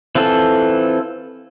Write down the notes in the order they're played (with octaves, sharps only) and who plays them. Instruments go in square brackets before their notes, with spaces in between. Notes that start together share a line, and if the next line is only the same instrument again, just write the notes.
[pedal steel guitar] E3 C4 F4 A4